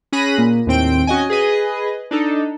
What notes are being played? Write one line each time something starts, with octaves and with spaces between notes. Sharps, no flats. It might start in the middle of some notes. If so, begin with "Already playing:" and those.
C#4 G#4 B5 F#6 A#6 D#7
A#2
D#2 A2 C4 G5 D7
C#4 F#4 D#5 G#5
G#4 B4 D#5
D4 D#4 A4